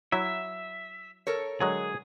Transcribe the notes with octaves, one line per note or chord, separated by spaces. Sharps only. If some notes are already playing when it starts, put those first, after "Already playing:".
F#3 E4 E5
A4 A#4 C#5
D3 F#3 G#3 G#4